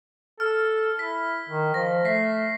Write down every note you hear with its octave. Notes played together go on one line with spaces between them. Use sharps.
A4 F6
E4 B6
D#3
F3 A#6
A3 B6 C7